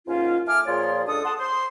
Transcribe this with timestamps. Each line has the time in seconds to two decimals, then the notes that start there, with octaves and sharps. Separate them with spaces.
0.07 D#2 G#2 C#4 F4
0.47 A3 G#5 D6 F6
0.67 A#2 F3 G#4 C#5 D5 C6
1.08 C#2 D4 A4 D#6
1.25 A4 F#5 A5 C6 D#6
1.39 C5 C6